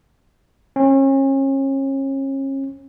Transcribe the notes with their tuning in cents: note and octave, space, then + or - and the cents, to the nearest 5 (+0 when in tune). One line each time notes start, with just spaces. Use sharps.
C#4 -35